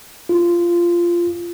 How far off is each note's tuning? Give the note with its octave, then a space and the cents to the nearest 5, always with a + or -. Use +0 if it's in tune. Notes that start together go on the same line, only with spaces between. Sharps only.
F4 -15